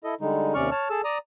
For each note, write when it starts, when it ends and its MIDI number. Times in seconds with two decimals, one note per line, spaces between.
0.04 0.15 64
0.04 0.15 69
0.04 0.15 75
0.21 0.54 50
0.21 0.54 55
0.21 0.54 56
0.21 0.54 63
0.54 0.70 39
0.54 0.70 48
0.54 0.70 61
0.54 0.70 74
0.54 0.70 85
0.54 0.70 89
0.71 0.88 73
0.71 0.88 81
0.71 0.88 89
0.90 1.01 68
0.90 1.01 69
0.90 1.01 81
0.90 1.01 88
1.04 1.18 74
1.04 1.18 82
1.04 1.18 87